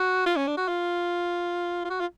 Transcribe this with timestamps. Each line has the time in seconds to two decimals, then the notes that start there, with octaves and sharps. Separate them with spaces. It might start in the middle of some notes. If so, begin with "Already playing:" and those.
Already playing: F#4
0.26 F4
0.37 C#4
0.48 D4
0.58 F#4
0.68 F4
1.85 F4
1.90 F#4
2.01 F4